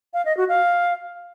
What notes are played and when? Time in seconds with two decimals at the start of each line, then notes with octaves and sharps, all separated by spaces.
0.14 F5
0.25 D#5
0.37 F#4
0.49 F5